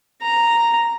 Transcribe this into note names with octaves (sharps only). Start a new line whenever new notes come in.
A#5